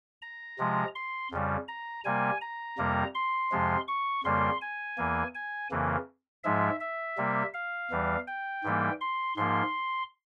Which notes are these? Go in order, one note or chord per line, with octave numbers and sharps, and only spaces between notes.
A#5
C3 F3 G#3
C6
F2 C#3 G3
A#5
C3 G3 A#3 G#5
A#5
F2 C3 G3 A#3
C6
F2 C3 F3 G#3
C#6
F2 C#3 G3 A#3 C6
G#5
E2 E3 A#3
G#5
F2 C#3 E3 A#3
G#2 F3 G#3 E5
E5
C3 G3 A#3
F5
E2 E3 G3
G5
G#2 E3 G3 A#3
C6
G#2 F3 A#3 C6